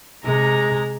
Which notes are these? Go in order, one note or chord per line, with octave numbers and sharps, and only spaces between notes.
C3 G#3 A#5